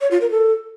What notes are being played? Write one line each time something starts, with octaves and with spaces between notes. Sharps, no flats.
C#5
F4
A#4
A4